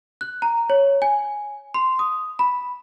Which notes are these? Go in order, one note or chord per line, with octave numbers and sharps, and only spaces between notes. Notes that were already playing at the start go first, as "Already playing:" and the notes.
F#6
A#5
C#5
G#5
C6
D#6
B5